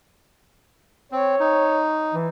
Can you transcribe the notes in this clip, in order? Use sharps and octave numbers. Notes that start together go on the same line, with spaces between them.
C4 C#5
D#4
E3